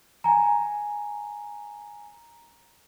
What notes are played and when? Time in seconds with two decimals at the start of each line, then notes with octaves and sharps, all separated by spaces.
0.24 G#5 A#5